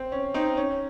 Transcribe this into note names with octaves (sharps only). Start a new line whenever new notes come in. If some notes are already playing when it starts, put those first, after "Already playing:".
Already playing: C4
C#4
C4 D#4
C#4